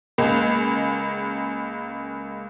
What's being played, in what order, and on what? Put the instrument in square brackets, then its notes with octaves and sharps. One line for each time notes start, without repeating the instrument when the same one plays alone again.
[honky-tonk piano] C#2 G#3 A#3